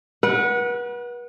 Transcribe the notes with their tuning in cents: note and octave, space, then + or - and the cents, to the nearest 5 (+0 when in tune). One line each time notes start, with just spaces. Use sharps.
B4 -35 F#5 +0